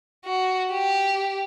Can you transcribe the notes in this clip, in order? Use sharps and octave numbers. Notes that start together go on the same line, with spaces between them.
F#4
G4